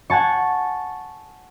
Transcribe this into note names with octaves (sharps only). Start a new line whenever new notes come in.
F#5 G#5 A5 C#6